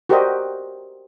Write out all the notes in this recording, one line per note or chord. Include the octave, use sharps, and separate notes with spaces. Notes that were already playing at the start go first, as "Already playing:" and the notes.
F#4 G4 A#4 C5 D5 D#5